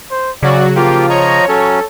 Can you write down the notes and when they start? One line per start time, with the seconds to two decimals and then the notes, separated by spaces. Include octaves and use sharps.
0.11 C5
0.43 C#3 F#3 F#4 D5
0.76 F3 A#3 F4 G4
1.09 C#5 D#5 A#5
1.48 F#3 C#4 A4